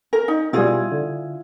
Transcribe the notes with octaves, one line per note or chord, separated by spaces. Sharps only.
A#4
D#4
B2 G3 E4 F4 G#4
D3